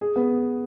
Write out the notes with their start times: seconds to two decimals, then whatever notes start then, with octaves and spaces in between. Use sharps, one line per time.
0.01 G#4
0.16 B3